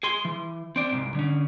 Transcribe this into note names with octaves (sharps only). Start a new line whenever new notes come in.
G#4 C6
E3
C4 D5
C2 G#2
D3 C#4